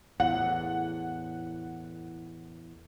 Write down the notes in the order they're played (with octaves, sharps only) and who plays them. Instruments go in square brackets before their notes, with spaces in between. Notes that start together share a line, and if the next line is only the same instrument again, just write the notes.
[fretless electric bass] E2 A2 [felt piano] F#5